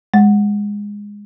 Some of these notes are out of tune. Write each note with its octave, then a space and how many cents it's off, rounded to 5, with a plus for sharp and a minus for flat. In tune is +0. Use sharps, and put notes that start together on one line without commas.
G#3 -15